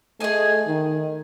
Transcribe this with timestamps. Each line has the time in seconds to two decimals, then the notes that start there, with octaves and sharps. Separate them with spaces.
0.20 A3 G#4 D#5 G#5
0.67 D#3